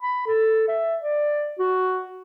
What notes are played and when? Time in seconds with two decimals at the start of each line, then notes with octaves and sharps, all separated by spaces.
0.01 B5
0.27 A4
0.68 E5
1.02 D5
1.59 F#4